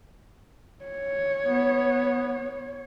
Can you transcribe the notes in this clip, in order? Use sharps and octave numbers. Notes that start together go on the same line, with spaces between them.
C#5
B3